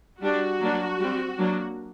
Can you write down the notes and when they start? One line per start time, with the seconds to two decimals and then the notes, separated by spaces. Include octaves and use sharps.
0.21 G3 D4 F#4
0.61 F#3 A#3 D4
1.00 G3 C4
1.39 F#3 A#3 D4